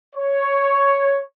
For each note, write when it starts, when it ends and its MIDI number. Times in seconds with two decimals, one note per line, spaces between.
0.16 1.21 73